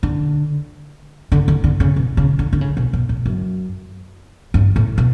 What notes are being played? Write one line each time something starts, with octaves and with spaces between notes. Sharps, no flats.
D3
D3
D3
D3
C#3
B2
C#3
D3
D3
C#3
B2
B2
A2
F#2
G2
A2
B2